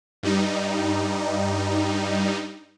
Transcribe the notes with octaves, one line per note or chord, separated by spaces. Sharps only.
G2 G3 D#4